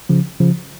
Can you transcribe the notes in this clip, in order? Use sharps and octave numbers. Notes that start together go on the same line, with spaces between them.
C#3 F3
C#3 F3